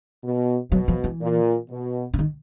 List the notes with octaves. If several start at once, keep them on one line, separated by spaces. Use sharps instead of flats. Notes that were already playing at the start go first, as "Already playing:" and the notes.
B2
B2 F#3
F3
E3
A#2
B2
D3
D#3